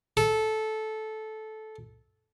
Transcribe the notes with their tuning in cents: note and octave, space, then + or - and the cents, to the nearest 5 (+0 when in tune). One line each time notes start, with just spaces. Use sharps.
A4 -15